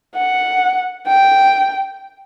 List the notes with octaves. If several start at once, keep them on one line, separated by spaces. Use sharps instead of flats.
F#5
G5